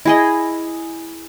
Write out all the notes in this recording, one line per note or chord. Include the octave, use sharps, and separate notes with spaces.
E4 G#4 D#5